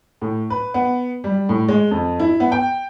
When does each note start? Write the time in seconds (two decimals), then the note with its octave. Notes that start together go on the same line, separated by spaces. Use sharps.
0.22 A2
0.50 B4
0.74 B3
1.24 G3
1.49 A2
1.68 G#3
1.91 F2
2.20 E4
2.40 B3
2.52 G5